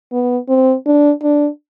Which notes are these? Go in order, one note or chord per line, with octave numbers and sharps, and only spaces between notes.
B3
C4
D4
D4